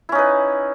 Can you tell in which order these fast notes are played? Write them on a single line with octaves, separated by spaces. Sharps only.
E4 C#4 D#4 B4